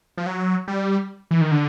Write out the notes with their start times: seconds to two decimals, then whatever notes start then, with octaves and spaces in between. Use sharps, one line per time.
0.17 F3
0.26 F#3
0.68 G3
1.31 E3
1.41 D#3
1.51 D3